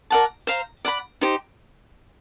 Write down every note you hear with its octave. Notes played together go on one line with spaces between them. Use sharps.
A#4 D5 F#5 A5
C5 F5 A#5
D5 F#5 B5
D#4 G4 C5